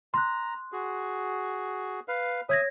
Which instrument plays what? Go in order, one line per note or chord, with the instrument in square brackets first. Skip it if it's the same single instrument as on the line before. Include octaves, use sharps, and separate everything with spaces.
[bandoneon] A#5 [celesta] C6 F#6
[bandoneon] F#4 G#4
B4 F5
[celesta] C#5 G#6 A#6 [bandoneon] E5 D#6